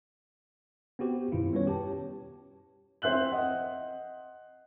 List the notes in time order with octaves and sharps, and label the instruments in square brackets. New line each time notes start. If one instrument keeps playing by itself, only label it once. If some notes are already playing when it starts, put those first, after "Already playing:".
[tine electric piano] B3 C4 F#4 G4 C5
F#2 B2 D#3 E4 F4
G3 B3 C#4 B4 C#5
G4 A5
[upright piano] C4 C5 E5 F#6 F#7
D#5 F#5